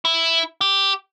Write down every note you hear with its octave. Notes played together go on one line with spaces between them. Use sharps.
E4
G4